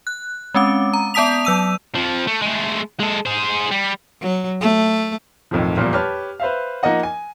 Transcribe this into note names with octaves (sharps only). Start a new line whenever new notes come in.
F#6
G#3 C4 C#4 D6
A#5
B3 D5 A5 D#6 B6 F7
F#3 E6 D#7
F2 F3
A3
G#3 A3
G#3 A4
G#4 C5
G3
F#3
A3
B1 F2 A2 D#3 F3
E2 A#2 F3 G3 A#3
G4 B4 C#5 A5 F6
B4 C5 E5 F5
F3 A#3 D#4 D#5 F#5
G#5